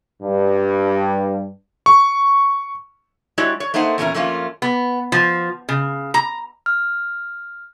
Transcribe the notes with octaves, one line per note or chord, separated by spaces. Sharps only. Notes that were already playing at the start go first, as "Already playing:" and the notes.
G2
C#6
G#3 E4 F#4 G4 C#5 D5
C#5
A3 A#3 D#4 C5 F#5
E2 A#2 A3 C#4 D#4 A#4
F2 A3 A#3 C#4 F4
B3
F3
C#3
A#5
F6